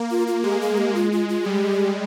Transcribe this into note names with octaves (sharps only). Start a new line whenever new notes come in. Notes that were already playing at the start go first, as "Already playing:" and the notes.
Already playing: A#3
F4
F4
G#3 G4
G#4
G4
F4
F4
F4
G3 G4 G#4